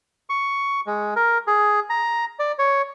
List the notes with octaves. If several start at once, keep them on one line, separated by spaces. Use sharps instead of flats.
C#6
G#3
A#4
G#4
A#5
D5
C#5